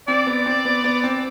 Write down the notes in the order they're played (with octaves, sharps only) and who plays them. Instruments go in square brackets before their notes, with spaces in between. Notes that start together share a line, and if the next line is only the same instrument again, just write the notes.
[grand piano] C4 [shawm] D5
[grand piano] B3
C4
B3
B3
C4